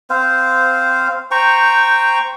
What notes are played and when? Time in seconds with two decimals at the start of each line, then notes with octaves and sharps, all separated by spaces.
0.10 C4 C5 F5
1.31 C5 G5 A#5 C#6